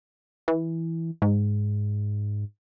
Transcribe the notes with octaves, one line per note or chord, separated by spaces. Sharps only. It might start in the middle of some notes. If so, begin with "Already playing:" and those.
E3
G#2